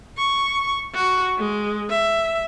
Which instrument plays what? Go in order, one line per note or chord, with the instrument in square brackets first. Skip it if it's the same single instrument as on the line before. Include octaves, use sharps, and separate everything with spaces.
[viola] C#6
F#4
G#3
E5